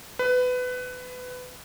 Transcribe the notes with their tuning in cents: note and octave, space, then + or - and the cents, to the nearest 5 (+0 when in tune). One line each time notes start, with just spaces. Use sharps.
B4 +20